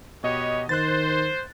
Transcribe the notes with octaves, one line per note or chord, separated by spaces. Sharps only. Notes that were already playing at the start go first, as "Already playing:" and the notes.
B2 G4 B4 C#5 D#5
D#3 C5 F#6 A6